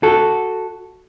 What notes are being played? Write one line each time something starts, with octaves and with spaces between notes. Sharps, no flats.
F#4 A4